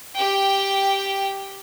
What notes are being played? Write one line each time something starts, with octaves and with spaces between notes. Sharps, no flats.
G4 G5